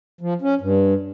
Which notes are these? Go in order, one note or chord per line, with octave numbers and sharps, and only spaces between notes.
F3
C#4
G2